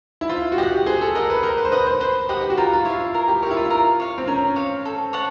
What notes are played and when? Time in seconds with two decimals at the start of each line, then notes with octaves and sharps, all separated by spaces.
0.21 E4
0.29 F4 C5
0.52 F#4
0.58 G4 D#5
0.63 F#5
0.86 G#4 C5
1.01 A4
1.15 A#4 D#5 F#5
1.30 B4
1.43 A#4 C5
1.57 B4
1.65 C5
1.72 B4 D#5 F#5
1.87 C5
2.00 B4 C5
2.29 G4 D#5 F#5
2.41 G4
2.50 F#4
2.57 F4 A#4
2.73 F4
2.85 E4 C#5 F5
3.14 A#4
3.28 G4
3.43 A#4 C#5 F5
3.51 E4
3.57 F4
3.70 A#4
4.00 C#5 F5
4.18 C4
4.27 C#4 A#4
4.56 C#5 F5
4.85 A4
5.13 C#5 F#5 A5